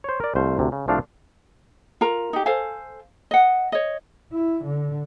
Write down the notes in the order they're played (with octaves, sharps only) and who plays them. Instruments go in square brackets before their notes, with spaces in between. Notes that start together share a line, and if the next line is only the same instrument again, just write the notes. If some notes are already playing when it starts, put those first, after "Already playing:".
[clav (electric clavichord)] C5 C#5
A#4 D5
C2 A3 C5 F5
D2 C3
C#3
C2 F3 A3 D4 F5
[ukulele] F4 A#4 A#5
D#4 G4
A4 C5 F5 G#5
D#5 F#5
C#5 D#5
[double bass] E4
D3